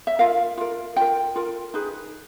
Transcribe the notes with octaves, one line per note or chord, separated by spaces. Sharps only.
E5
F4 A#4 F5
F4 A#4
F4 A#4 G5
F4 A#4
D#4 G#4 B4